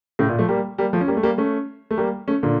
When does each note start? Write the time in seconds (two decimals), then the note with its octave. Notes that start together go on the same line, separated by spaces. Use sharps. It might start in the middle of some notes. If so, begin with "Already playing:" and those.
0.19 A2 C#3
0.29 A#2
0.39 F3 A3
0.49 G3 A#3
0.78 G3 A#3
0.93 F3 A3
1.01 C#4
1.08 G3 A#3
1.17 A3
1.23 G3 A#3
1.38 A3 C#4
1.91 A3
1.98 G3 A#3
2.28 A3 C#4
2.43 A#2 D3